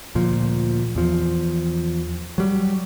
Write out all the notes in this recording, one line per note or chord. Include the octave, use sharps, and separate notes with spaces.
D2 A#2 F3
E2 F3
F#3 G3